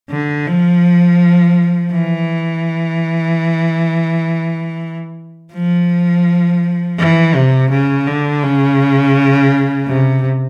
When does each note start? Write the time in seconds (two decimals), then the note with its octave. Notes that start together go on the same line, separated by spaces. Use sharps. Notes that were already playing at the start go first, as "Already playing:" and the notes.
0.11 D3
0.47 F3
1.92 E3
5.54 F3
6.99 E3
7.35 C3
7.71 C#3
8.07 D3
8.44 C#3
9.88 C3